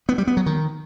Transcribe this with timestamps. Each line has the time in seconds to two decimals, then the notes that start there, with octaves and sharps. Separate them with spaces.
0.09 B3
0.18 G3
0.27 B3
0.37 F#3
0.46 D#3